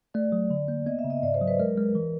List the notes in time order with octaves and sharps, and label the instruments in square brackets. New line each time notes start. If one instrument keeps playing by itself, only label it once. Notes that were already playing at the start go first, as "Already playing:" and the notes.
[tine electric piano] A3 [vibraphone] D5
[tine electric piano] F#3
D3
A#3
[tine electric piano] B3 [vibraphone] D#5
[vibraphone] E5
[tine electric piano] C#3
[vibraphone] D#5
[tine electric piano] G#2 [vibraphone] D5
[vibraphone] C5
[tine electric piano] F#3
[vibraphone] B4
[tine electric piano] G#3 [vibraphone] A#4
[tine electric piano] G#3
E3